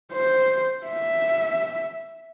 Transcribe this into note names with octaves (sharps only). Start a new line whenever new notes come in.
C5
E5